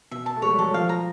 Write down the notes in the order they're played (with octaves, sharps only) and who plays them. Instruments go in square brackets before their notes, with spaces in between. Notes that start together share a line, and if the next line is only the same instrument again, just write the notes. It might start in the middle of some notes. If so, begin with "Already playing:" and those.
[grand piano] B2 [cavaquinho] E5
[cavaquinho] A5
[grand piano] A3
[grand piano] G#3 [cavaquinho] C#5
[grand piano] G3
[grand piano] F#3 [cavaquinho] A4
[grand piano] F3 [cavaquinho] F5
[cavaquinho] A#5